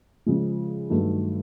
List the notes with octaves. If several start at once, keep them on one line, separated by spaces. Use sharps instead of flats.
C#3 F3 G#3
G2 D#3 F#3 A3